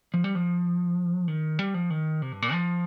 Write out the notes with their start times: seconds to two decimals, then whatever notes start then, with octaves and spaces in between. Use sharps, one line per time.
0.14 F3
0.24 G3
0.35 F3
1.28 D#3
1.59 G3
1.74 F3
1.90 D#3
2.22 C3
2.32 G2
2.42 A#2
2.53 F3